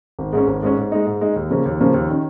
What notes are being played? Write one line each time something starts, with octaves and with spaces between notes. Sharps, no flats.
G#1
G#2 G#3 C#4
G#1
G#2 G#3 C#4
G#2
G#3 D#4
G#2
G#3 D#4
D#2
C#3 F3 A#3 C#4
D#2
C#3 F3 A#3 C#4
D#2
D#3 C#4